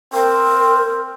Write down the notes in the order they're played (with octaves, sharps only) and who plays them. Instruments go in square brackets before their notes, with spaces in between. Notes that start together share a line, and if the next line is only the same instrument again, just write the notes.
[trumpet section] C4 [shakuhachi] A#4